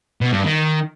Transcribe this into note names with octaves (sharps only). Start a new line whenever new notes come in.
B2
G2
D#3